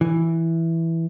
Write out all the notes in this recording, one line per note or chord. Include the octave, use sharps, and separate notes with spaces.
E3